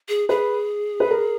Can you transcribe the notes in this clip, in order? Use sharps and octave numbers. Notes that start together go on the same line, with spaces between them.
G#4
G#4 B4
B4
A#4